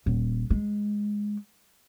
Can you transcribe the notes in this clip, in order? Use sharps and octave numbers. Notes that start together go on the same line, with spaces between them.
D#1
G#3